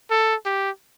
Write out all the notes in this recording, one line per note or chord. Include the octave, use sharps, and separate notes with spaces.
A4
G4